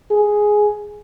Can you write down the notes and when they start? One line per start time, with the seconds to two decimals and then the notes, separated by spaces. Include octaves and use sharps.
0.11 G#4